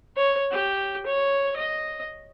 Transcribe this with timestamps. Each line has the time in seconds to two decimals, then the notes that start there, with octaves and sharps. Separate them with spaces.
0.17 C#5
0.51 G4
1.06 C#5
1.56 D#5